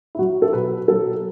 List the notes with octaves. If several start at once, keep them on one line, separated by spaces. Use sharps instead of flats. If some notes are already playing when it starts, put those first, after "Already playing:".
E4
F#3 F#4
A4
B2 B4
F#3 A4